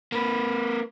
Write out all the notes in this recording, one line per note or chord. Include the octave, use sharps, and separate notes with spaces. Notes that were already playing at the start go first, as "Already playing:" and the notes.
A#3 B4